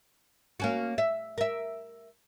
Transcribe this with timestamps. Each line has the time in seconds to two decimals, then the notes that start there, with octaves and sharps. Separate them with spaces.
0.60 A#3 C#4 F#4
0.98 E5
1.38 A#4 E5